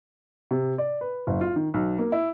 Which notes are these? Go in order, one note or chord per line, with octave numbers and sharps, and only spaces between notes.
C3
D5
B4
F#1
F4
D#3
B1
A#3
E4